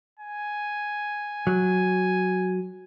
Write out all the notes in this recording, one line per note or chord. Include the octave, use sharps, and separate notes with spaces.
G#5
F#3